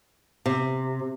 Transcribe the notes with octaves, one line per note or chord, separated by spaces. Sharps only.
C3